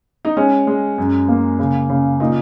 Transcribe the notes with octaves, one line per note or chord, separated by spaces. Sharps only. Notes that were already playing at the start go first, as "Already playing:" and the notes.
D#4
G#3 C#4
G#3
F#2
A#3
C#3
C#3
A#2 D#4